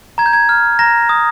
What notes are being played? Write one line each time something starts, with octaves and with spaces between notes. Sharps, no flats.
A#5 G#6
G6
G#6
F6
A#5 A#6
D#6